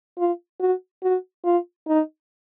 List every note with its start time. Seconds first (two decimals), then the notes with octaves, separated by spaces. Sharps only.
0.18 F4
0.59 F#4
1.03 F#4
1.44 F4
1.87 D#4